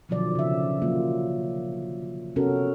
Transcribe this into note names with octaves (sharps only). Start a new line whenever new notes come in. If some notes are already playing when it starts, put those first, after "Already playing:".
B2 D3 D#3 F3 F#3 D5
C#3 E5
E3 F#3 A#3 F4
C3 B3 C#4 F#4 A4 A#4